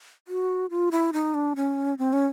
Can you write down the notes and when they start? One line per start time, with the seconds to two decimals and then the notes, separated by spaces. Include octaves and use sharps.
0.28 F#4
0.70 F4
0.91 E4
1.13 D#4
1.34 D4
1.56 C#4
1.98 C4
2.13 C#4